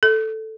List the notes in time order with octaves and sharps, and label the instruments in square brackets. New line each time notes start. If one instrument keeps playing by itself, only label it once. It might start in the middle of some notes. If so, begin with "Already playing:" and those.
[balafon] A4